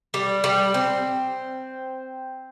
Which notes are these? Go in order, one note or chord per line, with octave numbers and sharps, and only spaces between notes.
G3
G3
C4